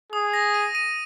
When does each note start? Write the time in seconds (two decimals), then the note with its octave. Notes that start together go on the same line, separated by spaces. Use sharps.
0.12 G#4 D#6
0.33 A#6
0.54 D#7
0.75 D#7